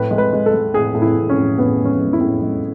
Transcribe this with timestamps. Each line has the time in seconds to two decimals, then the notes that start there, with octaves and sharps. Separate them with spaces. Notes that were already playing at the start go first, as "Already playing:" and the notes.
Already playing: A2 B4
0.11 G#3
0.18 B4
0.33 G#3
0.46 A4
0.54 G#3
0.74 A2 G#4
0.95 A2
1.02 E4
1.16 A2
1.29 C#4
1.38 A2
1.58 A2 B3
1.79 G#3
1.85 C#4
1.99 G#3
2.13 E4
2.21 A2
2.42 G#3